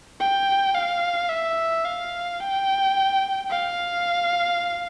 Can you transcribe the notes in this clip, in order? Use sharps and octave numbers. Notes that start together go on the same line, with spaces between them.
G5
F5
E5
F5
G5
F5